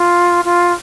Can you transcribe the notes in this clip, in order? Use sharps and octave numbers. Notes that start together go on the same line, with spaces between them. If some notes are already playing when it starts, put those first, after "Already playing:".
Already playing: F4
F4